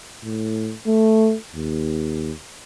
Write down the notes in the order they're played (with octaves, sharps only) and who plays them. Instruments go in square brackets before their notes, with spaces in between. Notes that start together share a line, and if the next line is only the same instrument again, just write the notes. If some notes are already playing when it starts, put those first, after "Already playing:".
[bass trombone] A2
A3
D#2